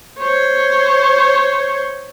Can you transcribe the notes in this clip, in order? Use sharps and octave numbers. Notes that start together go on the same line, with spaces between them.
C5 C#5